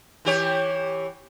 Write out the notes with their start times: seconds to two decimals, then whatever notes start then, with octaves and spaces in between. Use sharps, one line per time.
0.25 E3 G4 C#5